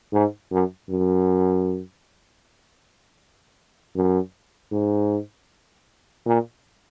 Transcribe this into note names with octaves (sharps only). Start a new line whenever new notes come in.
G#2
F#2
F#2
F#2
G#2
A#2